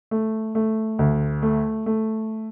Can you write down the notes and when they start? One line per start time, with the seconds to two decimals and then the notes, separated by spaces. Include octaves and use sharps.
0.11 A3
0.55 A3
0.99 D2
1.42 A3
1.86 A3